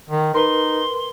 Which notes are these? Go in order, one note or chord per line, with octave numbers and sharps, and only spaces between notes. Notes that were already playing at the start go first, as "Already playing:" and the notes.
D#3
D#4 A#4 B4 C6